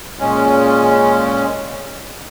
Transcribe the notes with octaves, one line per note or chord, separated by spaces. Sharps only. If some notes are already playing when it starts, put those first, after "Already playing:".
A#2 G#3 C#4